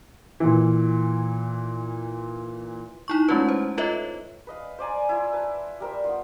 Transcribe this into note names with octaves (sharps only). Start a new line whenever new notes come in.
A#2 E3
D#4 E4 C#6
G#3 A3 C#4 E4 F4 B4
C5
F4 A4 B4 C#5 D#5 E5
B4 D#5 F5
C5 D5 G#5 A#5
E4 F4
B4 A5
G3 A#4 C5 E5
B3 F4